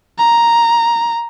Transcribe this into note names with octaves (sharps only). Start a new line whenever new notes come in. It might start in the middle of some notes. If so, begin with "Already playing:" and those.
A#5